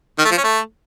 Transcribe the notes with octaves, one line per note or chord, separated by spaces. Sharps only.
D#3
A3
F3
C#4
A3